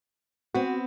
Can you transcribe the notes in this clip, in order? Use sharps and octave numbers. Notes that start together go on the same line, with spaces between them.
B3 C4 F#4